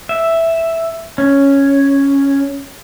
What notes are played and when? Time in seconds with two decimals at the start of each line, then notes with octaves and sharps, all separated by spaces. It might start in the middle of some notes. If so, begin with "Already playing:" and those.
0.09 E5
1.18 C#4